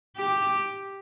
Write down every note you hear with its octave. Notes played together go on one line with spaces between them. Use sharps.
G4